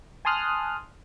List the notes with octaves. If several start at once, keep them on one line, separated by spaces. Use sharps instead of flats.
G#5 A5 C6 D#6 F6 F#6